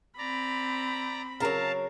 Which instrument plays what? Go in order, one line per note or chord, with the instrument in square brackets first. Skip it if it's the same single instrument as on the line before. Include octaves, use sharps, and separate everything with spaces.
[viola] C4 B5 [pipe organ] D5 A#5
[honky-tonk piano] C#3 A#4 [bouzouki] F#3 A#5 [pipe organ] F5 A5